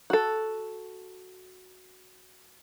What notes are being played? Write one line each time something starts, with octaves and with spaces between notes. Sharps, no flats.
F#4 A4